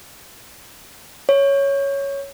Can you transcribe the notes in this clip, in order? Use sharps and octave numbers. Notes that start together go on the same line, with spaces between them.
C#5